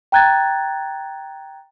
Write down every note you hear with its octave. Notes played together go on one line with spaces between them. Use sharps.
G5 A#5 F#6 G#6 A6